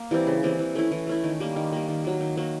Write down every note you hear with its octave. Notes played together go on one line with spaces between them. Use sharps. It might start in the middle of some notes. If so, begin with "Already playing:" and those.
Already playing: A#3
E3 G3 C4
C#3
E3 G3 C4
E3
A3 C#4 E4
E3
A3 C#4 E4
D#3
G3 A#3
D#3
G3 A#3
D#3
F#3 A#3
D#3
F#3 A#3